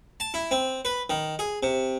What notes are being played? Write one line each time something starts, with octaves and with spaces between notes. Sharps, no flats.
A5
E4
C4
B4
D#3
G#4
C3